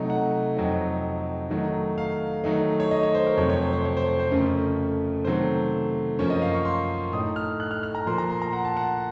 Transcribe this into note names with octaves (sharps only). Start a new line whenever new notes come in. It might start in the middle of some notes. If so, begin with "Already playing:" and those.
Already playing: C3 F#3 A3 D#4
F#5
F2 C3 F#3 C4 D#4
D#3 F#3 A3 D#4
F5
D#3 F#3 A3 D#4
C#5
D#5
C#5
C5
A#4
F2 C3 F#3 A3 C#5
C#5
C5
C5
C#5
C5
C5
C5
F2 C#3 A3 C#4 A#4
C3 D#3 F#3 A3 C5
F#2 F3 A#3 C#4 C#5
D#5
F5
C#6
C6
A2 A3 D#4 D#6
F6
F#6
F6
F6
A#5
A#2 F3 A#3 C6
A#5
C6
A#5
F#5
A5
F#5